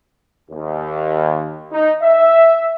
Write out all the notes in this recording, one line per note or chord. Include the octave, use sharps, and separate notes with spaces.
D#2
D#4
E5